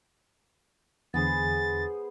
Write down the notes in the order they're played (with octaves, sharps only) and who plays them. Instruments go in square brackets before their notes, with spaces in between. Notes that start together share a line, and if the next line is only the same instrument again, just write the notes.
[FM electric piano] E2 D3 [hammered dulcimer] B3 G#4 C5 [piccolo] A6